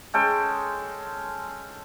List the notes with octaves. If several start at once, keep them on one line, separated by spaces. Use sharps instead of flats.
G#3 C#4 A4 G5